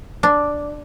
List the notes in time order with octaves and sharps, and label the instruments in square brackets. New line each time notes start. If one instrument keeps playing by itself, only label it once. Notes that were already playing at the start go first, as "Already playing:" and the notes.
[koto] D4